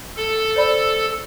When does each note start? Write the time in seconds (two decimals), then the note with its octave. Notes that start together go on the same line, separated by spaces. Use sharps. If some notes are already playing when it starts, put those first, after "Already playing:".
0.17 A4
0.56 C5 D5 B5